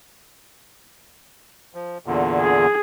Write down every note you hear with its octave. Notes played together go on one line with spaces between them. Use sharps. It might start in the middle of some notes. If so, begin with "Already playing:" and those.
F3
E2 A#2 D3
G#4